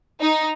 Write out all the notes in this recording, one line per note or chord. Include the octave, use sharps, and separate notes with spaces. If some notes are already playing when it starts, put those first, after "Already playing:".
D#4